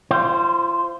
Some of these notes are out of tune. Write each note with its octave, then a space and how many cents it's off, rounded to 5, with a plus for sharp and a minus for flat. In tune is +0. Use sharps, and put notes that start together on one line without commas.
F4 -35 C5 +0